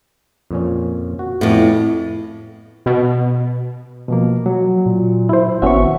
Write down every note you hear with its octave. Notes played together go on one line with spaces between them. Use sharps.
F2 A#2 C#4
F#4
F2 A2 B3
B2
B2 F3 A#3
F#3
A#2
E4 C5
G#1 B3 C#4 F#4 E5 C#6